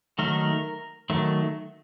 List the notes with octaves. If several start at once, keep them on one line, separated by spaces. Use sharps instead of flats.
D#3 F#3 A3 A#4
D#3 F#3 A3